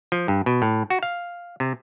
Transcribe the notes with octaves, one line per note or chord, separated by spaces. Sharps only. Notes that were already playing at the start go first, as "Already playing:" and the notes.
F3
G2
B2
A2
F#4
F5
C3